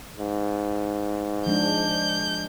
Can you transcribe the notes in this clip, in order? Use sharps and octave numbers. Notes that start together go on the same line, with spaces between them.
G#2
F3 G#3 D4 G6